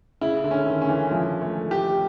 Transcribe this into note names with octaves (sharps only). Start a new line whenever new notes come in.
C#3 E4
D3
C#4
D#3
C#4
E3
F3 E4
A3
G4